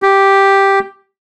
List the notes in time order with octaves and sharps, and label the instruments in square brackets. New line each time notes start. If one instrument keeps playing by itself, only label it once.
[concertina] G4